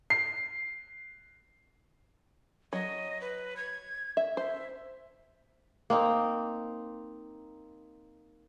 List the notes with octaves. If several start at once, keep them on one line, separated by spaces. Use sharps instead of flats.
C7
F#3 D#5
B4
G#6
E5
C5 E5
A#3 C4 D#4